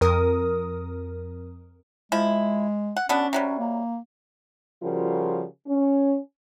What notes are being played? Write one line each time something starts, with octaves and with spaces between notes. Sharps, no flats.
F2 A#4 D#6
F3 G#3 E4
F#5
B2 B3 C#4 D4
C3 F#3 G3
A#3
C#3 F3 G3 F4 F#4 A#4
C#4